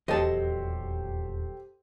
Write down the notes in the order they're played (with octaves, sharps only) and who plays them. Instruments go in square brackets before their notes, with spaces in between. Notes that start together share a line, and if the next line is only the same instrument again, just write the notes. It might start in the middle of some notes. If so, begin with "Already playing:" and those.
[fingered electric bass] D#1 E2 F#3 [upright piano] G4 A4 C5 [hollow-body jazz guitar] D#5 A5